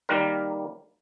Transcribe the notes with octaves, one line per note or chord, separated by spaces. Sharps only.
D#3 G3 A#3 A#4